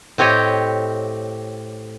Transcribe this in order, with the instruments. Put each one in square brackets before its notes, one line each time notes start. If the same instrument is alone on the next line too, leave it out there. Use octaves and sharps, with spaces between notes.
[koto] A2 C4 G4 C#5 D#5